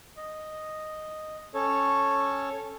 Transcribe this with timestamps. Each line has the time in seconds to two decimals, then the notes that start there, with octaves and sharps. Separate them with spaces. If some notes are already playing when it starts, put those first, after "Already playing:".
0.17 D#5
1.54 C#4 A4 C#5